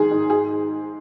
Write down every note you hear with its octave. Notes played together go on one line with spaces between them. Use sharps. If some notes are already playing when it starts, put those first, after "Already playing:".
Already playing: G#2 D#3 G#4
G#2
G#4